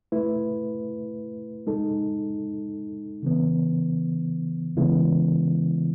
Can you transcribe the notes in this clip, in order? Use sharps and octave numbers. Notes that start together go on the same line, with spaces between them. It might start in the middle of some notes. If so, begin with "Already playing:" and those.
A3 E4 B4
G#3 D#4 A4
C#3 E3 B3
C#3 E3 G#3 B3 E4